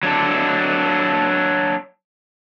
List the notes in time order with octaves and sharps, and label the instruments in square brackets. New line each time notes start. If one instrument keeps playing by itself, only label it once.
[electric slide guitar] F#3 D4 A4